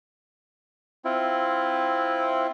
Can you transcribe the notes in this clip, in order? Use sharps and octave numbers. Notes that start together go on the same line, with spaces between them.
C4 E4 F4